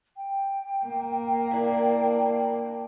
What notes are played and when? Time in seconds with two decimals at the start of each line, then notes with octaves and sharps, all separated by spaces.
0.17 G5
0.86 A#3
1.51 D4 E4